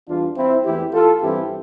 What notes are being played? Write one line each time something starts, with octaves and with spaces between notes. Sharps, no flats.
E2 E3 G3 D4 F4
C4 E4
E2 E3 A3 E4 G4
F4 A4
G2 E3 G3 C4 E4 G4